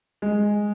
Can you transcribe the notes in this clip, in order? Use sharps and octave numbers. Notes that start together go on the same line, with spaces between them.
G#3